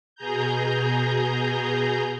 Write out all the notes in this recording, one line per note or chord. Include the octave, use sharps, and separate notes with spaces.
B2 G#4 A#5 G6